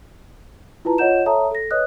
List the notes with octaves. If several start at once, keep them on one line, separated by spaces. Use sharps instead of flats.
E4 F4 B4 A5 A#5
F4 C#5 D#5 F#5 G6 E7
A4 C#5 E5 A5 A#5 D#6
A4 A#6
B4 C#5 D#5 D#6 F#6